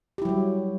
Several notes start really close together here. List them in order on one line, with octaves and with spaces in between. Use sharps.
G4 E4 F#3 G3